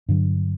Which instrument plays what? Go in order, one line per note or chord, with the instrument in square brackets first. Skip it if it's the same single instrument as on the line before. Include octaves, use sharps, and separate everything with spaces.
[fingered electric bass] G2 D3 F#3